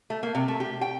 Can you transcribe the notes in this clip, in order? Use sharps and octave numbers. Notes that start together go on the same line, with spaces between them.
A3
A#3
C3
A3
G4
G5